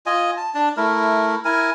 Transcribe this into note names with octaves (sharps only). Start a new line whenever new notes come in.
F4 D#5 G#5
A5
D4 A5
A3 E4 A#4
E4 A#4 G#5